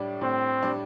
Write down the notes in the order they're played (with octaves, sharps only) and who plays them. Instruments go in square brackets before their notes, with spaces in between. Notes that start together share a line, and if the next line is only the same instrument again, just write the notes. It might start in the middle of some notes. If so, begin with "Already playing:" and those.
Already playing: [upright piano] A2 G3 D4
[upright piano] A2 [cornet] C4
[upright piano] G3 D4